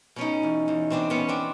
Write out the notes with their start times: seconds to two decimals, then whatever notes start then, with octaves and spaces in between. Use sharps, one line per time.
0.16 B2 C#4 D#4
0.43 E2
0.68 E2
0.90 B2 C4 D4
1.10 B3 C#4
1.16 B2
1.28 C4 D4